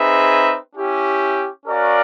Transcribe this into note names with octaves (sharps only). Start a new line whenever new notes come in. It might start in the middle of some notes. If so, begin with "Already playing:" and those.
Already playing: C4 D#4 G#4 B4 E5
C#4 E4 G4
C#4 F#4 A#4 D5 F5